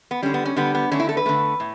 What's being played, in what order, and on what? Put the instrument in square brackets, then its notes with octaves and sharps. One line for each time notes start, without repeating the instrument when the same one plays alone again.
[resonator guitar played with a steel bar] B3
D3 G3 C#4
B3
C#4
D3 G3 B3
B3
D3 A3 C#4
E4
A4
B4
D3 A3
A2